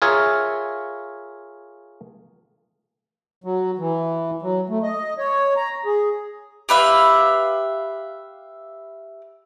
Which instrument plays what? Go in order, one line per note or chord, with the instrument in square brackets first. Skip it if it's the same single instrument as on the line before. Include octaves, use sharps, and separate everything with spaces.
[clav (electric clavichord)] F4 G#4 A#4 C#5 E5
[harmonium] F#3
E3
F#3
A3
D#5
C#5
A#5
G#4
[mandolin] G4 B4 E5 F5